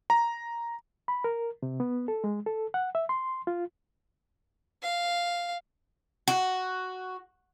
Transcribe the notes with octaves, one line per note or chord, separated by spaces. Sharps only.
A#5
B5
A#4
C3
B3
A4
G#3
A4
F#5
E5
C6
F4
F5
F#4